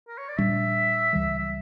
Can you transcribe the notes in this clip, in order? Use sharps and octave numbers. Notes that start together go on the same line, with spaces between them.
A#4
C#5
D5
A#2 G3 D4 E5
C#2 C#3 E3 G3
E5